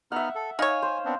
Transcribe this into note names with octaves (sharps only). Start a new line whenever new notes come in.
B3 D#4 E5 F#5 F6
A4
D#4 C#5 F5 G#5
C5
B3 C4 D4